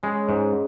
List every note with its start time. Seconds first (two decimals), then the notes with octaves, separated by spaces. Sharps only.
0.03 C#3 G#3
0.29 G#2